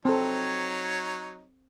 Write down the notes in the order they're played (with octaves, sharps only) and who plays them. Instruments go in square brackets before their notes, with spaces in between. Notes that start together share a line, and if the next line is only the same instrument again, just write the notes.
[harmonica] F#3 D#4 C#5 [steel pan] C4 A4